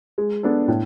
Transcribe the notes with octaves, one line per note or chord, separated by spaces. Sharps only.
G#3
B3 D4 A4
A2